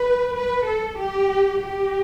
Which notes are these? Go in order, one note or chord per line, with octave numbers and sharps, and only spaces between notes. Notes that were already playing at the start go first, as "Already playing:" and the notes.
Already playing: B4
B4
A4
G4
G4